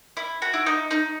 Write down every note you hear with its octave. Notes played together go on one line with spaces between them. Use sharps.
E4
F#4
E4
D#4
D#4